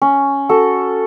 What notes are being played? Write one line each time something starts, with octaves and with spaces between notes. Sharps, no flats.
C#4
F#4 A4